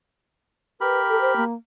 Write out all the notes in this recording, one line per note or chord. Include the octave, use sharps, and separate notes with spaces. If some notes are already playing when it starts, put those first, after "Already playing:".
G4 A#4 B4 B5
A4
C5
A#3